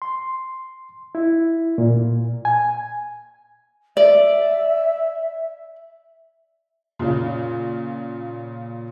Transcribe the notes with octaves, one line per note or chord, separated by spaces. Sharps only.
C6
E4
A#2
G#5
D5 E5
A#2 C#3